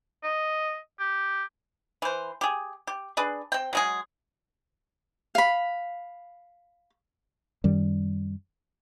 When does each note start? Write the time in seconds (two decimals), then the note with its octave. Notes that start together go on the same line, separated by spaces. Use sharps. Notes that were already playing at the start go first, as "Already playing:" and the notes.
0.23 D#5
0.99 G4
2.02 E3 C5
2.41 G4 G#4
2.87 G4
3.17 D4 G#4 B4
3.52 C4 G5
3.73 F#3 G#3 G#4
5.35 F5 B5
7.64 F#2 D#3 G3